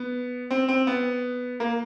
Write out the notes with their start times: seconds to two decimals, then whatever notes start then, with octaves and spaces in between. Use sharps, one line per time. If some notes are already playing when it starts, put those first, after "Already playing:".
Already playing: B3
0.51 C4
0.68 C4
0.87 B3
1.60 A#3